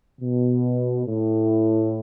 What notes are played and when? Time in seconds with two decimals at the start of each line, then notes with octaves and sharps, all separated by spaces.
0.20 B2
1.06 A2